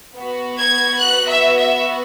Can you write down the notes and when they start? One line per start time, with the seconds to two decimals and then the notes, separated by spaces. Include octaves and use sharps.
0.16 B3 F#4
0.58 G#6
0.99 F#6
1.28 E5
1.56 E5